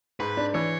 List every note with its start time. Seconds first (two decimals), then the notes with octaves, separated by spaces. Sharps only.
0.20 G#2 B4
0.37 D4
0.54 E3 C#5